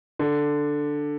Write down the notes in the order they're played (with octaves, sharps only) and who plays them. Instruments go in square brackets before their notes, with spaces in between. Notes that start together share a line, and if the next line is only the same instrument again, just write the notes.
[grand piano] D3